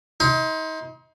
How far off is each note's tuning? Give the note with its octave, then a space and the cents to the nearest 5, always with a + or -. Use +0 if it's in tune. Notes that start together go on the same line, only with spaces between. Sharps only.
D#4 +35 C6 +0